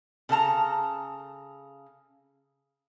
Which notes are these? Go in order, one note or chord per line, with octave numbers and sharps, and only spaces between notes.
C#3 A4 A5 A#5